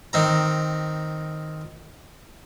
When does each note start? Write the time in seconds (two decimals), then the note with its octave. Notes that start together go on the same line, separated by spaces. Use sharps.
0.13 D#3 C4 A#5